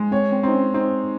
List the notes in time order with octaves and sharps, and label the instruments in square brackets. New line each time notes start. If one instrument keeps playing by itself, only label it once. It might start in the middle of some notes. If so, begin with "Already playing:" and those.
Already playing: [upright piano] G#3
[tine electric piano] C4 [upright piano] C#5
[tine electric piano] C4
[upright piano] C4 [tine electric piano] D#4
[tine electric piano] C#4
[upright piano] C4 [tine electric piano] D#4